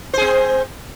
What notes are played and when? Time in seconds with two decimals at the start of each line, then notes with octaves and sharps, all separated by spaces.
0.13 C5
0.17 G#4
0.21 C4